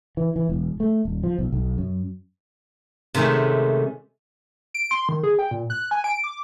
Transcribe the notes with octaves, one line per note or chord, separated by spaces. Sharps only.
E3
E3
E1
A3
D#1
F3
B1
B1
F#2
C3 D#3 G#3 A3 C#4
D7
C6
D#3
G#4
G5
A#2
F#6
G#5
D7
D6